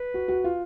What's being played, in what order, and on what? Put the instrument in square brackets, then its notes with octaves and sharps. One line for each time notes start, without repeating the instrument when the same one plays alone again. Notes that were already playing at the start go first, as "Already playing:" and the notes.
Already playing: [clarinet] B4
[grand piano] F#4
F#4
F4